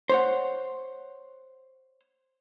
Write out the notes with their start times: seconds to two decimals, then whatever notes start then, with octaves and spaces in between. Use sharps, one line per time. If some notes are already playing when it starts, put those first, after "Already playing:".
0.09 C5 C#5 F#5